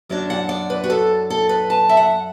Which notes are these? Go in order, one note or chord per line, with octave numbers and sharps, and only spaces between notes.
F#2 F#3 D4 D5
F#5
D5
B4
F#4
A4
A4
B4
A5
E5
F#5